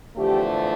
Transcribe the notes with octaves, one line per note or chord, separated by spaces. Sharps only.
E2 D3 F3 A3 G4